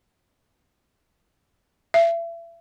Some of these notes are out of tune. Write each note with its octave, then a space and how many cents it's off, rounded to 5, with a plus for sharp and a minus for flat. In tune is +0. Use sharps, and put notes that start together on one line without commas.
E5 +35